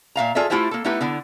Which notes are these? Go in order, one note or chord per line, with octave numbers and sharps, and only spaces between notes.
A#2 E5 F5 A#5
F4 G#4 A4 D5 E5
A3 E4 F4 G4 C5 E5
A#3 A4
A3 B3 D#4 E4 G4 B4
D3 B3 E4